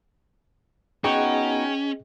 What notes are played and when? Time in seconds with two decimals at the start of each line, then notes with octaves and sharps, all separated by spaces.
1.04 B3 C#4 D#4 F#4 G#4 D#5 G5 C#6